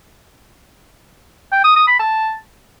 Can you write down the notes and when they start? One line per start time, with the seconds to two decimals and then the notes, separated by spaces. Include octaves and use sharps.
1.52 G5
1.64 D#6
1.76 D#6
1.88 B5
1.99 A5